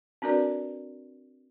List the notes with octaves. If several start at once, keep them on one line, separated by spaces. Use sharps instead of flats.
C4 D4 F#4 A#4 B4 D5